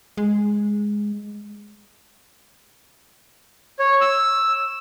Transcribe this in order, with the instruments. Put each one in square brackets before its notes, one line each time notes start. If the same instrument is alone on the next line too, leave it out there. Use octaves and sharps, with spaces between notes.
[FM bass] G#3
[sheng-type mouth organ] C#5
E6